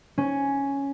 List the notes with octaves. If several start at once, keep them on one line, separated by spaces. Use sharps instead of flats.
C#4